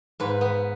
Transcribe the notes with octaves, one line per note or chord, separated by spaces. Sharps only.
G#2 B4
B3